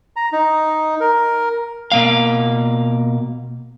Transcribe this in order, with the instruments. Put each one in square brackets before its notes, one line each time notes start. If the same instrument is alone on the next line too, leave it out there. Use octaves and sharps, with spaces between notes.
[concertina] A#5
D#4
A#4
[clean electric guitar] B2 A#3 F5